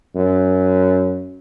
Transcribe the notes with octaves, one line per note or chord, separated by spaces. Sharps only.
F#2